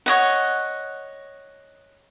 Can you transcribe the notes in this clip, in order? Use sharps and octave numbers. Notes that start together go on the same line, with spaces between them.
C#5 D#5 F#5